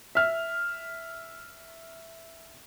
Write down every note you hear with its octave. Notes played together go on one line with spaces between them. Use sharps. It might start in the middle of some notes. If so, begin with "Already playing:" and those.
E5 F6